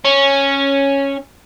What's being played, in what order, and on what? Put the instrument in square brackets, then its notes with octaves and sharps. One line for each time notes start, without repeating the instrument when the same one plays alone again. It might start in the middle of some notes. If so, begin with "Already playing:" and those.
[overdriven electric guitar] C#4